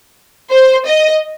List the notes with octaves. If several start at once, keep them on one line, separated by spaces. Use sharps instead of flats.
C5
D#5